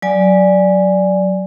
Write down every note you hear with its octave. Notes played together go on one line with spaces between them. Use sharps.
F#3 D5 G#5